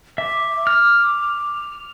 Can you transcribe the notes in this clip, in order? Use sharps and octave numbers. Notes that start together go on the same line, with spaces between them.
E5 D6
F6